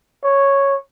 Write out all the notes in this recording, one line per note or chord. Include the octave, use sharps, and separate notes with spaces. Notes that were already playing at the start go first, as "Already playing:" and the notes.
C#5